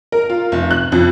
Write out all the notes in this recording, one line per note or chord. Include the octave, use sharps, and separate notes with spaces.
A#4
F4
F1
F#6
F2